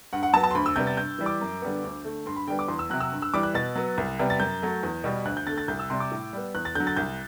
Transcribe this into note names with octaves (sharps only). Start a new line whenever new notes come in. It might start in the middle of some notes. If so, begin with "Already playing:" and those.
G2 F#5
F#5
F#3 B3 A5
A5
C6
D2 B5
E6
C3 G3 B3 G6
A6
G2 G6
E3 G3
D6
F#2
D3 G3 B3
D2
D3 A3
G2 C6
B5
D3 G3 B3 G5
D6
E2 C6
E6
C3 F#3 F#6
E6
G2
E6
E3 G3 D6
F#6
B2 A6
F#3 B3
C2
C3 G3 B3
A6
F#2 G6
F#3 A3
E2
B2 G3 B3
D2 F#6
G6
D3 A3 A6
A6
C2 G6
E6
C3 G3 C6
D6
A2
G3 B3
E2 F#6
A6
D3 F#3 G6
A6
C2 G6